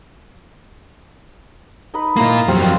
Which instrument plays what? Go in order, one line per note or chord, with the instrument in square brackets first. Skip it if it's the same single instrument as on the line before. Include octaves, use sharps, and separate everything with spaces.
[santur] D#4 B4
[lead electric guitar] A#3 F4 [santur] E4 A#4 D#5
[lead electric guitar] F2 F#3 [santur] C4 G4 F5
[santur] D5 C6